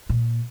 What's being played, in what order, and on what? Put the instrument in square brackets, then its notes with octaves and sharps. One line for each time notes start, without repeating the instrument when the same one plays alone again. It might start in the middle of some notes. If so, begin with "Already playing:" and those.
[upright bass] A#2